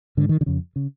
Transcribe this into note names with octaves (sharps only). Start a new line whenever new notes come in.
G#2 D3
D#3
D3
F2 C#3
C#3